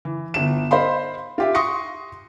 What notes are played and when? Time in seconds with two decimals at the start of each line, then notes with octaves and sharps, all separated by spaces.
0.05 E3
0.34 G1 E7
0.71 C5 D#5 F5 B5 C6
1.38 F4 G4 E5
1.55 C6 C#6 D#6 A#6 C#7